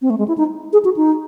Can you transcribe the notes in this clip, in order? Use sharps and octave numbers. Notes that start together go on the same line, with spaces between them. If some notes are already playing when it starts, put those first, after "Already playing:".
C4
A3
G#3
E4
D#4
G#4
F#4
D#4